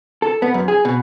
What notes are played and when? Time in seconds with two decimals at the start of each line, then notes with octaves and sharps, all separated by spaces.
0.22 A4
0.42 B3
0.54 F#2
0.68 G#4
0.85 B2